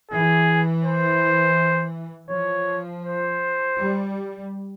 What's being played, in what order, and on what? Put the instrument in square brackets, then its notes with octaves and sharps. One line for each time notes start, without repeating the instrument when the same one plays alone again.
[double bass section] E3 [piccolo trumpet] G#4
[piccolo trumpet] C5
[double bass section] F3 [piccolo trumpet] C#5
[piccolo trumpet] C5
[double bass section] G3